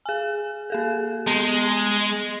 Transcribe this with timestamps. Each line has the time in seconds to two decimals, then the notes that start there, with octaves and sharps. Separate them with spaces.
0.05 G#4 G#5
0.70 A#3 G#4 A4
1.27 G#3 B3